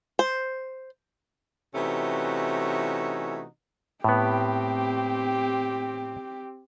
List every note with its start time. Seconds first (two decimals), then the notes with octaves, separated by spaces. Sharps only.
0.19 C5
1.74 C3 E3 A3 C#4 D#4 F#4
4.04 A2 B3 C4 G4